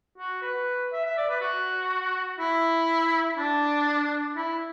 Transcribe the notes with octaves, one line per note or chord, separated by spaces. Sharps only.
F#4
B4
E5
E5
D5
B4
F#4
E4
D4
E4